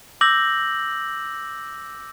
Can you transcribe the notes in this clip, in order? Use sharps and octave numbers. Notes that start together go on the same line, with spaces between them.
D6 E6 G6 A#6 F#7